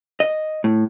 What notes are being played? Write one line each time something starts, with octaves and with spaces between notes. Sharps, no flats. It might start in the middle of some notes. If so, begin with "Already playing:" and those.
D#5
A2